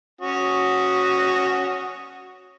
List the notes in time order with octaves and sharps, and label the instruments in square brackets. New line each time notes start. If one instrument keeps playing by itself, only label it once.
[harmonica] C#4 F#4 D#6